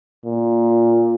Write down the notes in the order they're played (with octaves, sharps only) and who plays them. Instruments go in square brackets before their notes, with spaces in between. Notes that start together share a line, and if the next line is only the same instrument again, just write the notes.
[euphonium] A#2